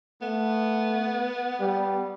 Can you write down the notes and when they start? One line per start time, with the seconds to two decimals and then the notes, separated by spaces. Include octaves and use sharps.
0.22 A3 B3
1.60 G3